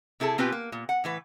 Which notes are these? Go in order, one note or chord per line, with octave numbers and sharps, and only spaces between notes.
C3 E4 G#4 A4 A5
B2 C4 F4 G4 B4 G#5
A#3
A#2
F#5
A2 E3 B4